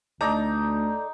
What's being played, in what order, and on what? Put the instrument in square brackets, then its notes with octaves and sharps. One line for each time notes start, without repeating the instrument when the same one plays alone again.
[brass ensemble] D2 [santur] D#4 [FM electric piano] A4 D5 [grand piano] A#5